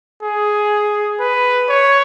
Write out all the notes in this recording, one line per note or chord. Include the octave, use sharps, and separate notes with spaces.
G#4
B4
C#5